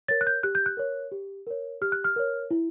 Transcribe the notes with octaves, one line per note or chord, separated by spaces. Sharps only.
A#4 C#5 A6
F#6
G6
G4 F#6
G6
F#6
A#4 C#5
G4
A#4 C#5
G4 F6
F#6
F6
A#4 C#5
E4